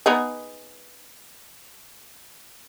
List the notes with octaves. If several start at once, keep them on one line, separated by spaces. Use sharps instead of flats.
B3 D#4 G#4